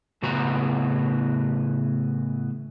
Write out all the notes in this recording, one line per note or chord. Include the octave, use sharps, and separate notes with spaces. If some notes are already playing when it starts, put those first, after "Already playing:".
A2 C#3 E3 B3 F#4 A#5